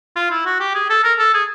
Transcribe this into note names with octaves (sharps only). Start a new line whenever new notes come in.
F4
E4
F#4
G4
G#4
A4
A#4
A4
G#4